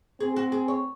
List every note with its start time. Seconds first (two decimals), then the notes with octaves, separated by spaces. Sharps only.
0.20 C4 G#4
0.36 F#4
0.52 G#4
0.68 C#5